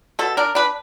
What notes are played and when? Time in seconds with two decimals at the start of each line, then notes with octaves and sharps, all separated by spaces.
0.19 B2 A4
0.37 D4 A#4
0.55 D4 B4